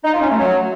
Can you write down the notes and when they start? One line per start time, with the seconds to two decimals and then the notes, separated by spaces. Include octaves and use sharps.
0.04 D#4
0.13 F4
0.21 C#4
0.29 A3
0.37 F#3